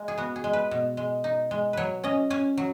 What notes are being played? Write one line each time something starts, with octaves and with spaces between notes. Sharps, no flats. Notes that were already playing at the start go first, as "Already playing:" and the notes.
Already playing: G#3
G#4
B3 F#4
G#4
G#3
B4
B2
G#3
D#4
G#3
F#3 B4 C#5
C#4 D#5
C#4 G#5
F#3